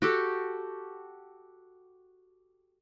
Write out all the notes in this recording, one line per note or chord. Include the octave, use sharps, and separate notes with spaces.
F#4 G4 A4